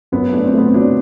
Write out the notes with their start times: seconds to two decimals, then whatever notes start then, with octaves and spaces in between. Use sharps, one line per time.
0.12 F#2 B3
0.33 A3 D4
0.44 C4
0.54 A3 B3
0.67 C4
0.74 F#3 D4